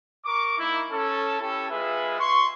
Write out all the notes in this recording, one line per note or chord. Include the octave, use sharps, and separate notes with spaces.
A#4 C#6 D6
A#3 D#4 E4
C#4 A4
C#4 E4 G4 A4
G#3 F4 G#4 B4 E5
C6 C#6